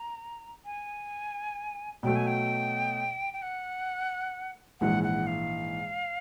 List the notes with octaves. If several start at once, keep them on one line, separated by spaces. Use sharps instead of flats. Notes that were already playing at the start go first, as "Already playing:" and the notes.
Already playing: A#5
G#5
B2 F#3 A3 G5
G#5
G5
G5
F#5
A#1 G#2 E3 F#5
F#5
F5